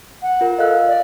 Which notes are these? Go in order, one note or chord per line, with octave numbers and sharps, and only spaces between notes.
F#5
F4 A#4
A4 D#5 F5 F#6
D5